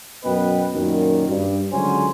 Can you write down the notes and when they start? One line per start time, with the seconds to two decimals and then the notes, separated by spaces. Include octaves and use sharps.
0.24 F#2 B2 B3 B4 D#5 G5
0.74 F#2 A#2 D#3
1.28 G2
1.72 C#2 D3 F#3 C#4 C5 G#5